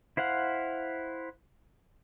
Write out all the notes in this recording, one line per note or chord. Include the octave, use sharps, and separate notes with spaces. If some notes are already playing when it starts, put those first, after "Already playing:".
E4 C5 F5 F#5